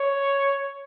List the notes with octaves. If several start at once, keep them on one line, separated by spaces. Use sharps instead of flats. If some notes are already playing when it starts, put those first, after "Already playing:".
Already playing: C#5